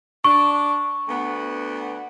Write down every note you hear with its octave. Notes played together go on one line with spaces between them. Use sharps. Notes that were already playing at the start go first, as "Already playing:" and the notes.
D4 C#6
D2 B3